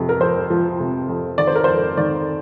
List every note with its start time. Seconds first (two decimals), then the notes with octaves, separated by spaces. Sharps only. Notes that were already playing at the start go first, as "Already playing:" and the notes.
Already playing: F2 C3
0.09 A#4
0.20 F2 C5
0.50 F3
0.80 C3
1.09 F2
1.38 D#3 D5
1.47 C5
1.55 A#4
1.64 F2 C5
1.97 D#3 D5